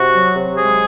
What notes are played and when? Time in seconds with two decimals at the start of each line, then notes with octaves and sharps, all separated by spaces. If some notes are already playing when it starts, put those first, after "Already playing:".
Already playing: C3 F#4
0.13 F#3
0.35 C3
0.57 G#3 G#4